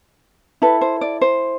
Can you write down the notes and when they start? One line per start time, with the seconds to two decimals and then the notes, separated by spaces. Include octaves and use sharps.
0.62 E4 A4 B4
0.81 C5
1.01 D5
1.21 C5